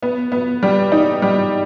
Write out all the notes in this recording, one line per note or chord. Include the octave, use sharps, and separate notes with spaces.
B3
B3
G3
D#4
G3